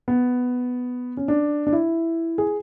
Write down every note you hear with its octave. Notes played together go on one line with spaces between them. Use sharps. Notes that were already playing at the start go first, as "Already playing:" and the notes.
B3
C#4
D4
D4
E4
G#4